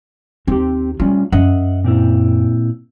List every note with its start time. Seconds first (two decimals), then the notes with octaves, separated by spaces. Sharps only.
0.47 D#2 C4 G4
1.00 G3 A3 C#4 F4
1.32 F#2 D#5 E5 F#5
1.84 A#2 C4 E4